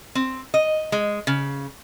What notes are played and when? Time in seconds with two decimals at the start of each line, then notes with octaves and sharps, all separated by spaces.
0.15 C4
0.54 D#5
0.92 G#3
1.27 C#3